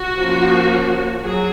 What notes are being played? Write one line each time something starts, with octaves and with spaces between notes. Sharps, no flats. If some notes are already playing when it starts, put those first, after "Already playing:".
Already playing: F#4
F3 A#3 C#4
F#3 G#4